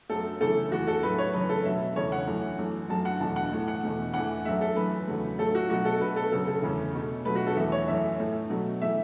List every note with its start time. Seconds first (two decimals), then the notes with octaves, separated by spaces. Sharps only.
0.09 F#2 F#3 A3 A4
0.41 F#2 C#3 E3 A3 A4
0.72 E2 E3 A3 F#4
0.88 A4
1.03 A2 F#3 A3 B4
1.19 C#5
1.33 F#2 C#3 E3 B4
1.49 A4
1.65 B2 F#3 A3 E5
1.96 E2 C#3 A3 C#5
2.12 F#5
2.27 F#2 E3 A3
2.59 F#2 E3 A3
2.89 F#2 F#3 A3 A5
3.05 F#5
3.20 E2 B2 F#3 A3 A5
3.36 F#5
3.52 A2 E3 A3
3.68 F#5
3.83 E2 B2 A3
4.14 E2 E3 A3 F#5
4.45 F#2 F#3 A3 E5
4.61 A4
4.76 F#2 E3 A3 B4
5.07 E2 C#3 F#3 A3
5.39 A2 F#3 A3 A4
5.55 F#4
5.70 B2 F#3 A3 F#4
5.85 A4
6.01 B2 A3 B4
6.16 A4
6.32 F#2 C#3 F#3 A4
6.48 A4
6.63 E2 C#3 A3
6.95 B2 A3
7.25 B2 F#3 A3 B4
7.36 F#4
7.47 A4
7.57 E2 E3 A3 E5
7.72 C#5
7.88 F#2 E3 A3 E5
8.19 A2 A3
8.50 B2 F#3 A3
8.82 E3 A3 E5